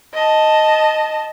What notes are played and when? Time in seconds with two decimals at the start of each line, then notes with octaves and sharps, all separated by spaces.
0.14 D#5 A5